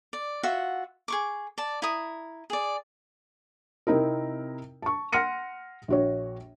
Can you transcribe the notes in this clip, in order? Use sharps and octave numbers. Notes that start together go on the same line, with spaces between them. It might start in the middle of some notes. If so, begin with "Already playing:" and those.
D5
F4 F#4 E5 F#5
G#4 C#6 D6
D5 A5
E4 A#5 D#6
G#4 D5
C3 C4 D#4 E4 A#4
A5 C#6
F#5 C6 F6 A#6 C#7 D#7
A#1 F#4 C#5